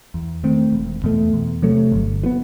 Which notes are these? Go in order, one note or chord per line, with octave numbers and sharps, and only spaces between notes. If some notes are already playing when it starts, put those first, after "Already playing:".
E2
D#3 A3 C4
E1
E2 B2 A3
E2
C3 F#3 A3
G1
E3 B3